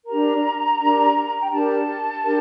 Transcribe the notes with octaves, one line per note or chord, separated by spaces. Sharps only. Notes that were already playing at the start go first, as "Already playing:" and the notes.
D4 G4 A#4 A#5
D4 G4 A#4
G5
D4 G4 A#4 A5
D4 G4 A#4